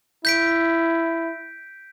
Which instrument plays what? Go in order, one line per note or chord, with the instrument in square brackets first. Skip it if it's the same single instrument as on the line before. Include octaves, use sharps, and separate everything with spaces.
[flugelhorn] E4 [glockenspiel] G6 B6 D7